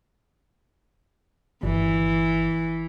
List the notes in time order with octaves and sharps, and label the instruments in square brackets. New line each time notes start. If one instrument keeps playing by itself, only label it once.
[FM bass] G1 [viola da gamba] E3